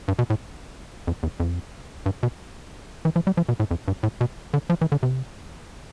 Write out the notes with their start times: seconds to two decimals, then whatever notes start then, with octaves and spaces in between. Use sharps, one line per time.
0.08 G2
0.19 B2
0.30 A2
1.07 F2
1.23 E2
1.40 F2
2.06 G2
2.23 B2
3.05 E3
3.16 F3
3.27 G3
3.37 F3
3.49 B2
3.60 A2
3.71 F2
3.88 G2
4.03 A2
4.21 B2
4.54 D3
4.70 F3
4.81 E3
4.92 D3
5.03 C3